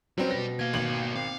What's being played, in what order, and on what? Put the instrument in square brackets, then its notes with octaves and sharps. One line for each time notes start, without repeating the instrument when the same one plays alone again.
[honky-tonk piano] F#3 C4 C#4 [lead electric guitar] G3
[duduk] B2 [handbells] B4 [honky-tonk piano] A#6
[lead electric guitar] D#2 A#3 [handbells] F5 G#6
[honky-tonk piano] G#1 F#7
[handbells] C4 [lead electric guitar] F5